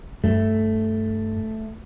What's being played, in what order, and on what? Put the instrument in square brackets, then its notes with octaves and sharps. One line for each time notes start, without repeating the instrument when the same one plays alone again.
[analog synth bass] G2 [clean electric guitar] A3